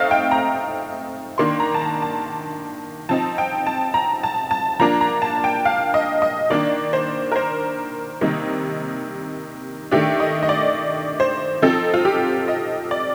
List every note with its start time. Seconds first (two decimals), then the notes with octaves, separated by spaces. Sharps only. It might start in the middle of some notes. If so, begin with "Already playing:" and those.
Already playing: A3 C4 D#4 D#5 F5
0.11 G5
0.31 A#5
1.38 D#3 A#3 D4 C6
1.60 A#5
1.74 A5
1.81 A#5
2.02 A5
3.09 F3 C4 D#4 A5
3.38 G5
3.67 A5
3.94 A#5
4.23 A5
4.51 A5
4.79 F3 A#3 D4 A#5
5.01 A#5
5.22 A5
5.44 G5
5.65 F5
5.94 D#5
6.22 D#5
6.50 D#3 A#3 D4 D5
6.93 C5
7.32 A#4
7.36 C5
8.21 C3 D#3 G3 A#3 D#4
9.91 D#3 A3 D4 G4
10.20 D#5
10.43 D#5
10.49 D5
11.20 C5
11.62 F3 C4 D#4 A4
11.94 F4
12.05 G4
12.48 D#5
12.91 D5